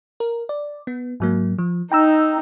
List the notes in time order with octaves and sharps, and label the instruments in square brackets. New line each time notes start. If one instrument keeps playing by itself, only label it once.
[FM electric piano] A#4
D5
B3
G#2 F#3 A#3
F3
[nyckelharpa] D#4 [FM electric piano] G5 A#5 E6